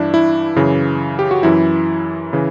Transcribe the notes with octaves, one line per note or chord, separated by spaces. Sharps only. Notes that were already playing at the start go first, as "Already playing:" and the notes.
Already playing: G2 E3 D4 E4
E4
F#2 C#3 E3
G4
F#4
F#2 E3 E4
C#3 E3